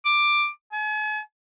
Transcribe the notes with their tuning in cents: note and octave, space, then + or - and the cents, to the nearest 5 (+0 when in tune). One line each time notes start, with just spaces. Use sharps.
D6 +10
G#5 +45